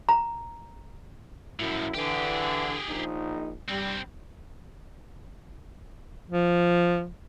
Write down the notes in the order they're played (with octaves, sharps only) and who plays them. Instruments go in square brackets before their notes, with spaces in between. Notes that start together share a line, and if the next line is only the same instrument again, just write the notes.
[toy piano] A#5
[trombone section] F#2 E4 [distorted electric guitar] A2 F3
[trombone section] D3 E3 [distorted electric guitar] G4 G#4
[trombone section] A#1 D#4
[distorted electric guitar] G2 C4 [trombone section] G3
[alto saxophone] F3